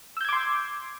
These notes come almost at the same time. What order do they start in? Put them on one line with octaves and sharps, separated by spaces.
E6 G6 G#6 D6 C6